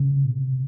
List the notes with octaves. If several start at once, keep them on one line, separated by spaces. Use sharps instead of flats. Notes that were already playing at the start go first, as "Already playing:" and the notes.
Already playing: C#3
A#2
C3